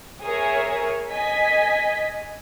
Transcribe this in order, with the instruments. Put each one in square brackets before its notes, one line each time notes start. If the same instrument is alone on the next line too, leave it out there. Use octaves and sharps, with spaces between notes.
[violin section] G#4 A#4 C#5 E5
D#5 G#5 B6